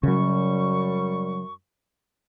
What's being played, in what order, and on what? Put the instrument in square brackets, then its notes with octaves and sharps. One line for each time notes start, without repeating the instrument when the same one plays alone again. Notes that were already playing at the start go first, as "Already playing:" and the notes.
[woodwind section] F#2 G3 C#6 [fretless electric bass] C#3 F#3